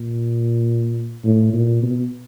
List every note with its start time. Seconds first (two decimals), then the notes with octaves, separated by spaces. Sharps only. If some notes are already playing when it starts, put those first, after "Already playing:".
Already playing: A#2
1.24 A2
1.53 A#2
1.83 B2